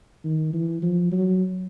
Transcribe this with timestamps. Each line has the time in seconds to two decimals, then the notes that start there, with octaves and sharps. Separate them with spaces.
0.24 D#3
0.53 E3
0.82 F3
1.12 F#3